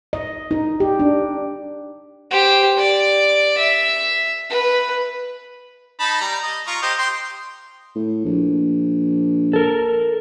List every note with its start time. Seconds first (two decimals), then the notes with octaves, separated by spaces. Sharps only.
0.13 D#5
0.51 D#4
0.80 G4
0.99 D4
2.31 G4 C5
2.77 D5
3.58 E5
4.50 B4
6.00 D#4 A5 B5
6.21 G3 A#5
6.43 D#5
6.67 F4 A#5 C#6
6.82 G4 C5 D#5
6.99 G5 C6
7.95 A2
8.25 A#1
9.53 A4 A#4